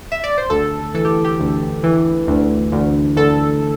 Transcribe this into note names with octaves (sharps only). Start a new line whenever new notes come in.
E5
D5
C5
D2 A4
E3 A4
G4
G4
D2
E3
D2
D2
D2 A4